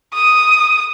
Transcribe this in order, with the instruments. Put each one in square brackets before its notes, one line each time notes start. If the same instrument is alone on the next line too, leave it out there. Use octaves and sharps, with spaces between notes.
[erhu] D#6